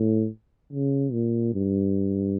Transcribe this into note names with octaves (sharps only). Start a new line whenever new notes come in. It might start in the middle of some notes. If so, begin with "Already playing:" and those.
Already playing: A2
C#3
A#2
G2